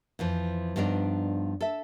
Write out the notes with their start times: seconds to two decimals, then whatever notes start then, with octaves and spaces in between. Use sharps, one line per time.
0.19 F2 E3 F3
0.76 G2 F3 B3 D4 D#4 D5
1.61 A4 E5